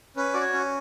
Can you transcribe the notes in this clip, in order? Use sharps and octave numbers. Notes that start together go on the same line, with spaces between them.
C#4 B4
F#4 D5
C#5
C#4